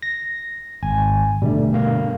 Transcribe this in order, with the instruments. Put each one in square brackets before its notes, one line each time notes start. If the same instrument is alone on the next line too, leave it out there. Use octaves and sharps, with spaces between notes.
[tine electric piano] A#6
[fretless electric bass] G#1 [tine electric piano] G#5
[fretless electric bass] B2 D3 A3 [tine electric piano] G3
[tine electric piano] G2 A#3 F5